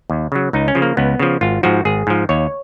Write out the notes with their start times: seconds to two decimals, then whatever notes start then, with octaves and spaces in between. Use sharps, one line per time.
0.10 D#2
0.32 C#3 F#3
0.53 C#2 D#4
0.68 C#4
0.75 C#3 F3
0.82 A#3
0.97 C#2 B3
1.19 C#3 F3
1.41 G#1 F4
1.63 G#2 F3 F#4
1.85 G#1 G#4
2.07 G#2 F3
2.29 D#2 C#5